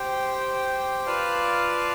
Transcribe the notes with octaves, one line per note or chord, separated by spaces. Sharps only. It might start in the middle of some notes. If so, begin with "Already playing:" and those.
Already playing: G4 C5 G5
F4 B4 D5 F5 A5